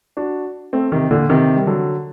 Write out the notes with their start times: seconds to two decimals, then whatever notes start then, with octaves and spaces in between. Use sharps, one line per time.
0.17 D4 F#4
0.73 A3 C4
0.92 C3 D#3
1.11 A#2 D3
1.29 C3 D#3
1.56 G3
1.67 D3 F#3